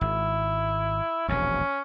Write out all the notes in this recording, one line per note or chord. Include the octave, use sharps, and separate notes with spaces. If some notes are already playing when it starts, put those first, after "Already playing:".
G#1 E4
E1 A#1 D#2 C#4